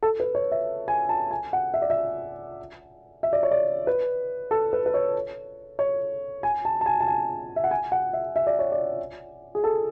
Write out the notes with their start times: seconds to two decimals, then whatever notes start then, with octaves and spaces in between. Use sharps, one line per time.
0.03 A4
0.20 B4
0.35 C#5
0.52 E5
0.88 G#5
1.09 A5
1.31 G#5
1.53 F#5
1.74 E5
1.82 D5
1.90 E5
3.23 E5
3.33 D5
3.43 C#5
3.51 D5
3.87 B4
4.51 A4
4.73 B4
4.86 B4
4.94 C#5
5.79 C#5
6.43 G#5
6.65 A5
6.81 A5
6.86 G#5
7.01 A5
7.08 G#5
7.56 E5
7.64 F#5
7.71 G#5
7.92 F#5
8.13 E5
8.36 E5
8.47 D5
8.59 C#5
8.72 D5
9.55 G#4
9.64 A4